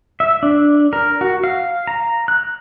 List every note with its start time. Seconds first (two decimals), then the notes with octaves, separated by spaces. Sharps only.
0.20 E5
0.43 D4
0.93 A#4
1.21 F#4
1.44 F5
1.87 A#5
2.28 F#6